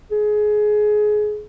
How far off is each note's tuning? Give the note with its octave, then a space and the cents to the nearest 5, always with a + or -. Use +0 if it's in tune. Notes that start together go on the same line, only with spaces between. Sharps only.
G#4 +20